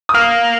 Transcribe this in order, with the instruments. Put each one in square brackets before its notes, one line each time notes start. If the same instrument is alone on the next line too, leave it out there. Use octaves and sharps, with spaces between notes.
[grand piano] D#6
[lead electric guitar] A#3 [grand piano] F6